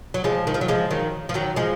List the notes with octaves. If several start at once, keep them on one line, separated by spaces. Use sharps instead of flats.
F#3
F3 G#3
D#3
F3
F#3
F3 G#3
D#3 F#3
F3
D#3 F#3
F3 G#3